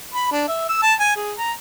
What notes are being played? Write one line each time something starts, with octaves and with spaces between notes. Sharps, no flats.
B5
D4
E5
E6
A5
G#5
G#4
A#5